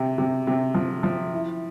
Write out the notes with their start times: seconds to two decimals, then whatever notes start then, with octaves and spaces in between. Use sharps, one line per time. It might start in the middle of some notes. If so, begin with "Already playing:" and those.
Already playing: C3
0.18 C3
0.47 C3
0.74 F3
1.03 F3
1.33 E4